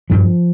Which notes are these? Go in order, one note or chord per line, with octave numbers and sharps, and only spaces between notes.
G2 F3